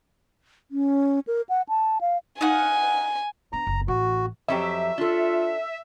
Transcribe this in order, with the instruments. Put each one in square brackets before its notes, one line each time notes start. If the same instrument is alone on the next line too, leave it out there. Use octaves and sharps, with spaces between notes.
[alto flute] C#4
A#4
F#5
A5
F5
[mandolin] D#4 F5 F#5 [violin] G#5
[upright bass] B3 D4 [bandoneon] A#5
[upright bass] F#1
[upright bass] A1 [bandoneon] F#4
[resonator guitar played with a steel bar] F2 F#3 G4 [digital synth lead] E5
[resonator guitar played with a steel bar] D4 A4 [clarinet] F4